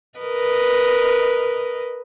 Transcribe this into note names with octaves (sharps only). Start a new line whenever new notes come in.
A#4 B4 D#5